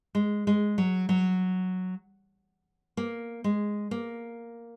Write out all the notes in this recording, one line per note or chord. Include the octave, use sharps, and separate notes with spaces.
G#3
G#3
F#3
F#3
A#3
G#3
A#3